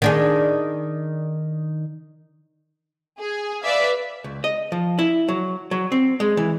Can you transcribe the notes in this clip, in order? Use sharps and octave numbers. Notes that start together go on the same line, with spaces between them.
D#3 D4 G#4
G#4
B4 D5 E5 F5
C#2
D#5
F3
E4
F#3
F#3
C4
G#3
E3